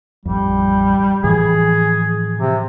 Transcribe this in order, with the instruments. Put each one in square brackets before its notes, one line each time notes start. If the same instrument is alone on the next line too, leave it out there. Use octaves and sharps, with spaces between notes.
[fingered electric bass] A1 F2 [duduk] G3
[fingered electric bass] A2 E3 F3 [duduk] G#4
[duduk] C3